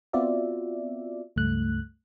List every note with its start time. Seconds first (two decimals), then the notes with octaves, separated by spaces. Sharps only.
0.13 B3 C4 F4 F#4 D5 E5
1.36 C#2 G2 A3 F#6